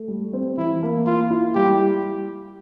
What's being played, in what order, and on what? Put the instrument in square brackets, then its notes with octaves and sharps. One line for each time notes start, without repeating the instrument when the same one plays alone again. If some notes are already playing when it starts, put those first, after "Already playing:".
Already playing: [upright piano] A3
G3
C4
[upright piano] E3 [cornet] E4
[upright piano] A#3
[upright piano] A#3 [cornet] F4
[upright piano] E4
[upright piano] G3 [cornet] G4